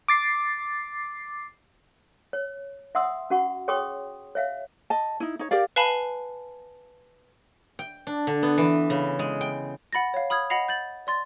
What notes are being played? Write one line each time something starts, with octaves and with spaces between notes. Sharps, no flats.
D6 A6 C7
C#5
E5 F#5 C6 D#6 E6
C#4 F#4 F#5 C#6
G#4 C#5 G5 C6 C#6 D#6
C#5 E5 F5
D#5 A5
D#4 E4
D#4 C#5
G4 A#4 D5 F5
B4 F5 G#5 A5 B5
G5
D4
D3
B3
E3
C#3
G#3
G5
F#5 B5 A6 A#6
C#5 F5
B5 D#6 F6 G#6
D#5 F#5 B5 A#6 C7 F7
G6 A6 F#7
D5 C6 A6